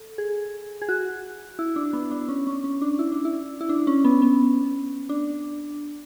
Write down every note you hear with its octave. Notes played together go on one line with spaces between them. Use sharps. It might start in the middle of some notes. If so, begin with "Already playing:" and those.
Already playing: A4
G#4
G#4
F#4
E4
D4
B3
D4
C#4
C#4
C#4
D4
E4
D4
E4
E4
D4
C#4
B3
B3
D4